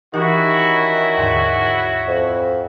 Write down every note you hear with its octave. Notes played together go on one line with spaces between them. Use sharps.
D#3 E3 C#4 D#4 E4 F#4 G4
D#2 G#2 D3
F2